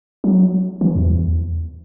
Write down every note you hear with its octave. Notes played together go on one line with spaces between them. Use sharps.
F#3
E3
E2